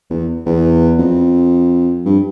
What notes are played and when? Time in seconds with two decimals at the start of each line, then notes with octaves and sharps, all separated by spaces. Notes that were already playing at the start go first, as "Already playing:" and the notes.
0.10 E2
0.46 E2
0.99 F2
2.05 G2